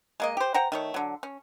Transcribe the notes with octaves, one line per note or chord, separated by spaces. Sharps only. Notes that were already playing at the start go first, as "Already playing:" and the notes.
G#3 A#3 D#5
G4 C5
C5 F#5 G5 A#5
D#3 A3 C#5
D3 F#3
C#4